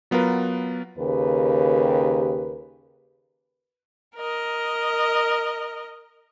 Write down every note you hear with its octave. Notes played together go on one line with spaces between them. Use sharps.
F#3 B3 F4 A#4 B4
D#2 C#3 G4 A#4 B4
A#4 D#5